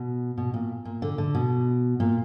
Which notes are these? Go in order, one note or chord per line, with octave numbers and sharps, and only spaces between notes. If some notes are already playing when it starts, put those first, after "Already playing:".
Already playing: B2
B2
A#2
A#2
D3
D3
B2
A#2